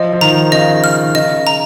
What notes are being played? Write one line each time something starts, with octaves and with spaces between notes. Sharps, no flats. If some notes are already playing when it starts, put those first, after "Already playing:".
Already playing: F3 D#5
F3
D#3 A#5
C#3 D#5
F6
D#3
C#3 D#5
A#5